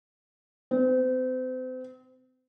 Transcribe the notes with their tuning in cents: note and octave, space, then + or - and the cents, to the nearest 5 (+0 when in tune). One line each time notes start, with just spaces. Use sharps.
C4 -35